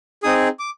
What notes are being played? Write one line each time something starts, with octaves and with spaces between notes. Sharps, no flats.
C4 D#4 G#4 D#6
D6